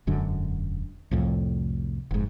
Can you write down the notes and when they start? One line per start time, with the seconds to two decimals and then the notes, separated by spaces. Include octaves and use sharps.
0.07 E1 F#2 D3
1.11 C2 F2 A2
2.11 F1 G#2